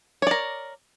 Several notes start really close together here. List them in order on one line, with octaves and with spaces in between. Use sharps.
C#5 D5 A#4